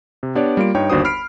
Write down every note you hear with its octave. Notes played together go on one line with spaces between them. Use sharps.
C3
B3 D4 G4 C#5 D5
G3 A#3 F4 D7
G2 D#4 C#5 G5
G1 D#2 D4 F#4 C5 D#6
B5 F6 C7 D7